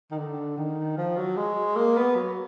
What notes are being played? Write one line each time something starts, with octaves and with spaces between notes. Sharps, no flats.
D#3
D3
D#3
F3
F#3
G#3
A#3
B3
F#3